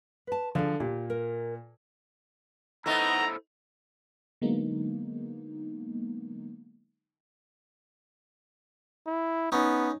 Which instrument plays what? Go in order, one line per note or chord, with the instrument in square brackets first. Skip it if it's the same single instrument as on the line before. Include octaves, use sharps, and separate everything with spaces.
[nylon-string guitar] B4 A5
[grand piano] D3 [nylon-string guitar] F3 G#4 D5
[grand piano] A#2 [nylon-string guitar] G4
[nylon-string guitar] A#4
[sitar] A3 B3 D#4 [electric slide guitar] E4 A4 C5 [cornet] A#5
[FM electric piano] D3 F#3 G#3 A#3 B3 D#4
[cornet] E4
[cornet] B3 [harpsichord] C#4 D#4